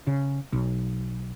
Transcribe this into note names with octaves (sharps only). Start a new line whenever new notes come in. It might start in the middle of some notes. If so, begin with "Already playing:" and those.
C#3
B1